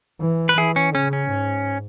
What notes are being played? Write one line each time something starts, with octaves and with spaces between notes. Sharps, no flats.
E3
B4
E3 E4 G#4
C#4
C#3 C#4
C#4
G#2